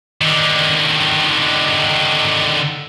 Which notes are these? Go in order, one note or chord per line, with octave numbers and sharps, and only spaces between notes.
D3 D#3